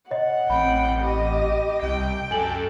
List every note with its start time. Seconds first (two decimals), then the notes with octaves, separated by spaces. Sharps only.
0.11 C#5 D#5 F#5
0.50 A1 C4 G5 B5
1.02 G4 D#5 B5
1.83 C2 G5
2.31 F#2 A4 G#5 F#7